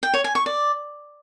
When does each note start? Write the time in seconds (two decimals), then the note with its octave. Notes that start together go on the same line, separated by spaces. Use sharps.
0.03 G5
0.14 C#5
0.24 G#5
0.35 C#6
0.46 D5